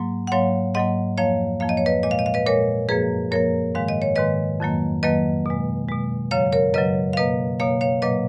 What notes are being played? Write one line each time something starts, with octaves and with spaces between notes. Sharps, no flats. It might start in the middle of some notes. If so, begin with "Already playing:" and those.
Already playing: G#2 F#3 A#3
F#5
G#2 F#3 A#3 C#5 F5
G#2 F#3 A#3 D#5 F#5
F2 F3 A#3 C#5 F5
F2 F3 A#3 F5
D#5
C#5
B4 D#5
A#2 G#3 D#5
F5
D#5
F5
B4 D#5
A#2 G#3 A#4 C#5
F#2 F3 A#3 G#4 B4
F#2 F3 A#3 A#4 C#5
G#2 D#3 G#3 F5
D#5
C#5
G#2 D#3 G#3 B4 D#5
F2 D#3 F#3 A#3
F2 D#3 F#3 A#3 B4 D#5
B2 G#3
B2 G#3
F#2 C#3 F#3 C#5 F5
A#4 C#5
F#2 C#3 F#3 B4 D#5
F5
B2 A#3 B4 D#5
B2 A#3 C#5 F5
C#5 F5
A#2 F#3 A#3 B4 D#5